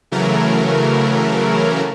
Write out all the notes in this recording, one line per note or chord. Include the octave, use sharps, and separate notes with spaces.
C#3 E3 F#3 A3 A#4